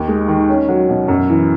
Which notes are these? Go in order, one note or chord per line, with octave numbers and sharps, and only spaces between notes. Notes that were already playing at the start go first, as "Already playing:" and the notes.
Already playing: D#2
G#3
D#3
C#4
F#3
B2
F#2
E3